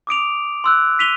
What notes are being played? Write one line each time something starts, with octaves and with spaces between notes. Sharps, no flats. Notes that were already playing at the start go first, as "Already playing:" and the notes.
D6 D#6 D7 F7
C6 E6 F#6
B6 D#7 F7 G7